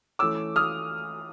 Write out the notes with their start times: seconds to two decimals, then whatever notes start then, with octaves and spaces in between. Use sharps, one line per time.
0.19 E3 A3 C#4 D6 E6
0.56 D#6 F6